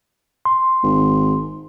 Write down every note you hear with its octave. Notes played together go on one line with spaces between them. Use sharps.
C6
G#1